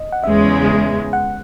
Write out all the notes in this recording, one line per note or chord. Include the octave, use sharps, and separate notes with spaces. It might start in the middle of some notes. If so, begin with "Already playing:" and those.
Already playing: D#5
F#5
E2 C#3 G#3 E5
F#5